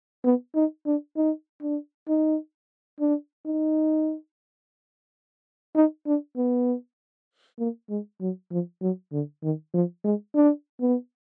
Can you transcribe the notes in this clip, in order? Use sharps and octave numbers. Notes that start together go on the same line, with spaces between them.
B3
D#4
D4
D#4
D4
D#4
D4
D#4
D#4
D4
B3
A#3
G#3
F#3
F3
F#3
D3
D#3
F3
G#3
D4
B3